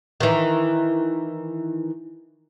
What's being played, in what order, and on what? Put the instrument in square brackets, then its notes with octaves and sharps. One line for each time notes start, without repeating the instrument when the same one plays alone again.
[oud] D#3 E3